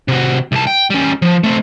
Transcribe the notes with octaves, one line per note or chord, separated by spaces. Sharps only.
C3 F#4
C2 A5
G5
G3 C#4
F3
A3 C4